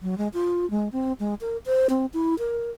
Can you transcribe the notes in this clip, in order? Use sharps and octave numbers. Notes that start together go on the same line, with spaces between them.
F#3
G#3
F4
G#3
C4
G#3
A#4
C5
C4
E4
A#4